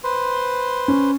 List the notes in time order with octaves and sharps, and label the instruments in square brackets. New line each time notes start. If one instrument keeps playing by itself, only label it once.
[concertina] B4 C5 C6
[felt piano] C#4